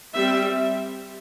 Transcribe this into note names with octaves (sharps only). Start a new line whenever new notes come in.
G3 C4 E5